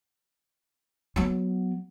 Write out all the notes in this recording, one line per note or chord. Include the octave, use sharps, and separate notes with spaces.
F#3 B3